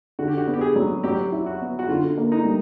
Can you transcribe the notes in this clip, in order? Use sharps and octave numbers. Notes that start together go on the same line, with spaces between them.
D3 F#4
G4
F#4
B3
G4
G#4
F#3
F#3 G4
E4
F#4
B3
F#4
D3 F4
A#3
D#4
G3